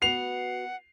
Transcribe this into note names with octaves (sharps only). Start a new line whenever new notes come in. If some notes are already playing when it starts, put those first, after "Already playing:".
B3 F#4 B4 F#5 C7 F7